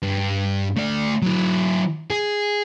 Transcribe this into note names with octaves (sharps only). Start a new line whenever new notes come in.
G2
A3 D5
F#3 E4
G#4